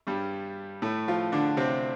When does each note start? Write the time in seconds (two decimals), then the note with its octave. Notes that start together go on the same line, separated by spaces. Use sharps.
0.07 G2 G3
0.82 A2 A3
1.08 F3 F4
1.32 D3 D4
1.57 C3 C4